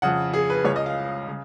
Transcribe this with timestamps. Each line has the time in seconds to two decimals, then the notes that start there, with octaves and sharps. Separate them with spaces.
0.02 F2 C#3 F#5
0.33 G#4
0.50 B4
0.65 C#2 C#3 C#5
0.76 D#5
0.86 F5
1.27 C#3